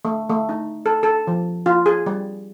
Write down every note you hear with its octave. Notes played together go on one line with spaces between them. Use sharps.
A3
A3
D#4
A4
A4
F3
F4
G#4
G3